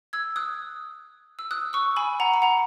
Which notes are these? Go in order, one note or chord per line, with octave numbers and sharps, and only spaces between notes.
E6 G#6
D#6 F#6
E6
D#6 F#6
C#6 E6
G#5 B5
F#5 A#5
B5
F#5 A#5